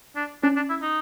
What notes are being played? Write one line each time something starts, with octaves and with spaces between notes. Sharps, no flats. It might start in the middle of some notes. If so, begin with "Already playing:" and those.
D4
C#4 D4
D4
E4
D#4